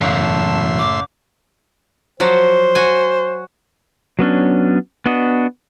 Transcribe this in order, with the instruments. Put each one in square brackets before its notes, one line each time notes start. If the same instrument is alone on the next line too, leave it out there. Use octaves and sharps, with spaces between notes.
[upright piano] F#1 [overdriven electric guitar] B1 E2 [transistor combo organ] A2 E5 C6 [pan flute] F5
[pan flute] A5
D6
[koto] F3 F#3 F#4 [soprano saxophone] C5
[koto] F#4 G#5
[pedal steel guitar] F#3 B3 C#4 D4
B3 D4 F#4 D#5